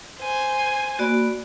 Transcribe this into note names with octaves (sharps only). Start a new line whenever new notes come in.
C5 G#5
A#3 F#4 D5 B5